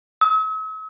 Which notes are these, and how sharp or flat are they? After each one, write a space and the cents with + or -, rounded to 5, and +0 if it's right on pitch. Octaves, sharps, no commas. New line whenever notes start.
E6 -45